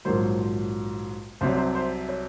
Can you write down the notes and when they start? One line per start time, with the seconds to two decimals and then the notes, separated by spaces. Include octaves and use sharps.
0.05 A#1 G#2 D#3 F#3 C5
1.41 C2 C3 F#3 C5
1.49 C#5
1.56 C5
1.75 C5
2.09 C#5